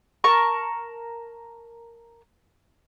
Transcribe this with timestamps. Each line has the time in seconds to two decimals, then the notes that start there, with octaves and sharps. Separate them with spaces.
0.24 A#4 A5 C#6